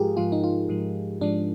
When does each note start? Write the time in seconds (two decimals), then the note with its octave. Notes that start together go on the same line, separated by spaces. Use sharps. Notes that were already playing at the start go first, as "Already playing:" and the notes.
Already playing: G#2 F3 G#3 F4 G4 G#4 A#4
0.17 G#2 F3 G#3 F4
0.32 D#4
0.44 F4
0.69 G#2 F3 G#3
1.21 G#2 F3 G#3 D4